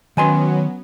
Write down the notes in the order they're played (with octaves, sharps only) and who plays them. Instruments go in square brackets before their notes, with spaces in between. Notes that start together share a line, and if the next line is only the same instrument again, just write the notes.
[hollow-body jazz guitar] D#3 G#5 C6 [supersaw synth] F#3 B3 C#4